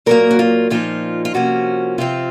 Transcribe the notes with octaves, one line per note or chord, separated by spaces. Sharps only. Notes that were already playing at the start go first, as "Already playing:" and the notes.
A#2 F#3 A#3 A#4
F#4
F4
A#2 F3 A#3 D#4 F4
F4
C3 F3 A#3 C#4 F#4
C3 F3 C4 F4